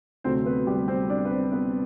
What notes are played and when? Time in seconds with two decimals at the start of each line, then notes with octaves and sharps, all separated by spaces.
0.24 D2 C3 F#3 A3 C4 C5
0.46 B3 B4
0.67 G3 G4
0.88 C4 C5
1.09 D4 D5
1.25 B4
1.31 C4 C5
1.52 B3 B4